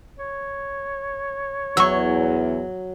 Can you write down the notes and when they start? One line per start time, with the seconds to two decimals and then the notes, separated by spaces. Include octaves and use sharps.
0.19 C#5
1.77 E2 F#3 C#6 E6